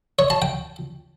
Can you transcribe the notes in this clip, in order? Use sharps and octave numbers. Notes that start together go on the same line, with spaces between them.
C#5
A5
G5